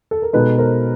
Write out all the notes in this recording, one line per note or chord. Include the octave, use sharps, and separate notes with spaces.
A4
A#4
B2 G#3 B3 D#4 A4 B4
A#4 C5